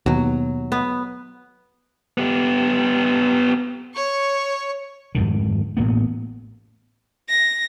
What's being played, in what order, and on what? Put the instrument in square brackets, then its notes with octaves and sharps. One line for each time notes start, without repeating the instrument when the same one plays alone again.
[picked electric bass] D#2 B2 [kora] F#3
[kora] B3
[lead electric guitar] B3 G4
[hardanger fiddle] C#5 C#6
[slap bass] F2 G#2 D3 D#3
A1 A2 A#3 B3
[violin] A#6